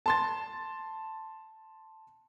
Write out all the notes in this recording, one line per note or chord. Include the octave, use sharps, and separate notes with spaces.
A5 C6 A6